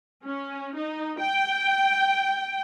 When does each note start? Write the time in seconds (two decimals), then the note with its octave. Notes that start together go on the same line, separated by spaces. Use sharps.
0.25 C#4
0.75 D#4
1.20 G5